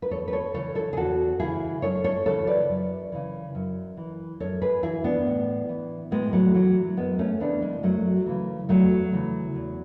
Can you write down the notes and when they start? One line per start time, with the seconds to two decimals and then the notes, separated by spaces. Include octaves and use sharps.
0.02 B4
0.11 E2 A4 C#5
0.28 B4
0.32 A4 C#5
0.54 C#3 E3 A4 C#5
0.75 A4 C#5
0.93 G#4
0.97 E2 F#4 A4
1.40 C#3 E3 E4 G#4
1.82 F#2 A4 C#5
2.04 A4 C#5
2.25 C#3 E3 A4 C#5
2.47 B4 D5
2.69 F#2
3.12 C#3 E3
3.55 F#2
3.97 E3
4.40 F#2 A4 C#5
4.62 G#4 B4
4.83 E3 E4 G#4
5.04 B3 D4
5.26 A2
5.69 E3
6.11 A2 G#3 B3
6.33 F#3 A3
6.54 E3 F#3
6.97 F#2 G#3 B3
7.19 A3 C#4
7.40 C#3 E3 B3 D4
7.62 G#3
7.83 F#2 F#3 A3
8.26 C#3 E3
8.69 E2 F#3 A3
9.12 C#3 E3
9.55 E2